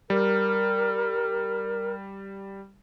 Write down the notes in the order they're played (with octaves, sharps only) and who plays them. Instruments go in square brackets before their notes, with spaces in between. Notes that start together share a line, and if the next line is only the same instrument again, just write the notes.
[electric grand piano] G3 [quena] A#4